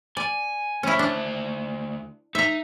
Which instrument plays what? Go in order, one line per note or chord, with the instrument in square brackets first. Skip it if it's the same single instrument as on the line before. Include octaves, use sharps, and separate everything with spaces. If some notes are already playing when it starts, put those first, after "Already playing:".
[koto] D5 [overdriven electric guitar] G#5
[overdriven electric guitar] D2 C5 [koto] C#4 E4
[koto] D4
[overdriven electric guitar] D#4 [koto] E5 A#5